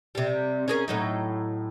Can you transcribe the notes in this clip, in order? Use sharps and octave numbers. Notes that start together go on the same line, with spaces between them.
C3 G3
C#4 G#4 A#4
A2 F#3 D#4